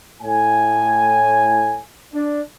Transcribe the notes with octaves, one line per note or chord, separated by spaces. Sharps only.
A2 G#5
D4